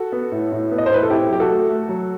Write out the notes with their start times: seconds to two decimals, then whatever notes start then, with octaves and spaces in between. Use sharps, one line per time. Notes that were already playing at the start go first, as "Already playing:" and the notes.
Already playing: F#4 A4
0.12 B3
0.32 A2
0.52 A2
0.71 B3
0.78 D#5
0.86 C5
0.90 A2 B4
1.03 A4
1.10 C4 E4 G4
1.30 F#3 G4
1.40 F#4 A4
1.50 A3
1.69 A3
1.89 F#3